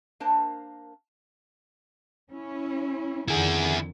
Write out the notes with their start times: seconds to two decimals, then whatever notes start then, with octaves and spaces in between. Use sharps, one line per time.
0.20 A#3 D4 A#4 C5 A5
2.32 C#4 E4
3.28 F2 D3 D#3 E4 G#4